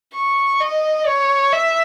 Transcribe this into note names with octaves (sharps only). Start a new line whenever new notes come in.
C#6
D#5
C#5
E5